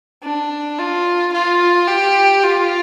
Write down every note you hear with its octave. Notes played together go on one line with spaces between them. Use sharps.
D4
F4
F4
G4
F4